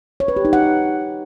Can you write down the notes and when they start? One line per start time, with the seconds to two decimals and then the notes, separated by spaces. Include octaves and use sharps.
0.20 C#5
0.28 B4
0.37 G4
0.45 D#4
0.53 F#5